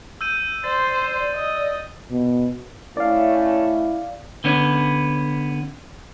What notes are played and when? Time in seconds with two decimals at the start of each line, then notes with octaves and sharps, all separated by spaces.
0.21 E6 G6 D#7
0.64 C5 D5 A6
1.35 D5 D#5
2.11 B2
2.97 A3 C#4 E4 D5 F5
4.44 D3 B3 C#4